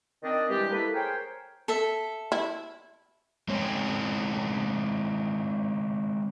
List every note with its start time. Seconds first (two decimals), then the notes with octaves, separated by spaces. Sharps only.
0.23 D#3 C4 D4 D#5
0.49 G2 E3 G3 G#3 G4
0.71 A3 A#3 E4 A4 B4
0.94 G#4 A#4 C5 C#5 G5
1.68 A4 E5
2.32 E4
3.48 G#3 C4 C#4 C#5